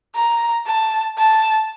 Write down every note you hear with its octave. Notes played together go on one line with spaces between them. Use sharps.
A#5
A5
A5